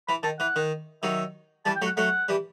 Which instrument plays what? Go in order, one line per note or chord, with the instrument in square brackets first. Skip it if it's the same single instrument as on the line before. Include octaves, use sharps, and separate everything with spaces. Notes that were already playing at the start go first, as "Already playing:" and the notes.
[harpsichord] E3 [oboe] B5
[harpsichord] D#3 [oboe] A5
[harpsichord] E3 [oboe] F#5
[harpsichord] D#3
[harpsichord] D#3 F#3 [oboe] E5
[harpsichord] E3 G3 [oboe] A5
[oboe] G5
[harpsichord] F#3 A3
[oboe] F#5
[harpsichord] F#3 A3 [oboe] F#5
[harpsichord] E3 G3